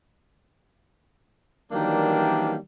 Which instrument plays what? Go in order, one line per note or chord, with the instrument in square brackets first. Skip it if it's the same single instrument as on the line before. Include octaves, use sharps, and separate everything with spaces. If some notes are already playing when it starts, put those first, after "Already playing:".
[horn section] D#3 E3 F#3 G3 A#3 D4